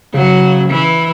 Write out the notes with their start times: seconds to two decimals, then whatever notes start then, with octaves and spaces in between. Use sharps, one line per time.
0.14 C#3 F#3
0.68 E3